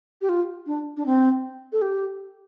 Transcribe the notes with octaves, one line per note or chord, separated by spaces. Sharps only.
G4
F4
D4
D4
C4
A4
G4